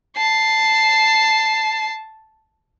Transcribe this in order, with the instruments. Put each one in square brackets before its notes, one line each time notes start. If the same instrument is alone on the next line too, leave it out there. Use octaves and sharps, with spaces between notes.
[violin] A5 C7